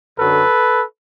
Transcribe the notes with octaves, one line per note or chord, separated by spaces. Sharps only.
F#2 D3 F#3 A4 B4